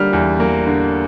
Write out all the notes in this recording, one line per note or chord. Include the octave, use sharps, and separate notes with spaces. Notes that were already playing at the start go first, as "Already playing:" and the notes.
Already playing: D3 G3 A#3 F6
E2
A#3
D3